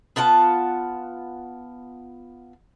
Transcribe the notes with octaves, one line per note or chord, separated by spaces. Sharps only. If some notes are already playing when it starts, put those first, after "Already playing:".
B3 F4 F#5 A5